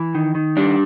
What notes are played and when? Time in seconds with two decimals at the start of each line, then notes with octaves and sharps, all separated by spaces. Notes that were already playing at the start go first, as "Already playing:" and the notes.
Already playing: E3
0.15 D#3
0.35 D#3
0.57 G3 D4